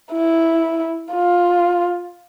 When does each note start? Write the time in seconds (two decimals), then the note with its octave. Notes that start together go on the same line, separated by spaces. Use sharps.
0.12 E4
1.13 F4